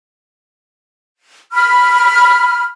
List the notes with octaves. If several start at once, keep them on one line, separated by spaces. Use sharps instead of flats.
B5 F6